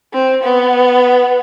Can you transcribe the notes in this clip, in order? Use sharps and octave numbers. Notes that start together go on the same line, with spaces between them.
C4
B3